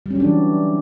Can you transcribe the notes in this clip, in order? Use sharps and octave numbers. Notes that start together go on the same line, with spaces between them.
E3 F#3 G3 C#4 D4